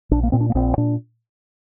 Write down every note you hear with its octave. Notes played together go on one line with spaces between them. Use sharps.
A#1 D4
A#3
A#2 C4
D4
A#3
A#1 C4
A#2 D4